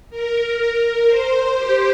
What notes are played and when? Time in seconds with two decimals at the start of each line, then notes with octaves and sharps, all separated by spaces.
0.10 A#4
1.07 C5
1.56 G4